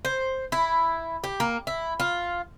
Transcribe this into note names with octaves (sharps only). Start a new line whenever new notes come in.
C5
E4
G4
A#3
E4
F4